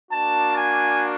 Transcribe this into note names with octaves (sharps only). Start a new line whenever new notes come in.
A#3 D4 F#4 A5
G#5